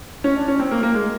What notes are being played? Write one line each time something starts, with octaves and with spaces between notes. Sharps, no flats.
C#4
D4
C#4
C4
A#3
A#3
G#3